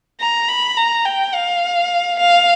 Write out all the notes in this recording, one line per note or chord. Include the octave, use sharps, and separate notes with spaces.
A#5
B5
A#5
G5
F5
F5